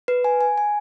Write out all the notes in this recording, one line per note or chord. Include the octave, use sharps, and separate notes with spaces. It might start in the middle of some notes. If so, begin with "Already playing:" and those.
B4
G#5
G#5
G#5